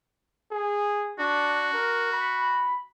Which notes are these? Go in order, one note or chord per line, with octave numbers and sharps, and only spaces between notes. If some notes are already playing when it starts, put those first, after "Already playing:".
G#4
D4 F#4
A#4
B5